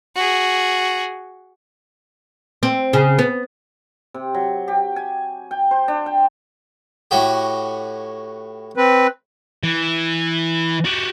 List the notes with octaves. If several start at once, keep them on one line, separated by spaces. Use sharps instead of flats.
F#4 G#4
C4
C#3
B3
C3
F#3
G4
G#5
G5
C5
D4
G5
A2 F#4 G4
C4 B4
E3
F#4 G4